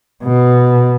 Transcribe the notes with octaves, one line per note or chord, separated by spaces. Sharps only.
B2